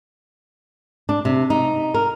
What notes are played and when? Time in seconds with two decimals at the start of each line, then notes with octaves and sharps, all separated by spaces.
1.09 D4
1.25 C3
1.50 D#4
1.94 A#4